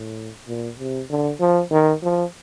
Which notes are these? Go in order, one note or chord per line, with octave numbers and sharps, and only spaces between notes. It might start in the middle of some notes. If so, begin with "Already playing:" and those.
Already playing: A2
A#2
C3
D3
F3
D#3
F3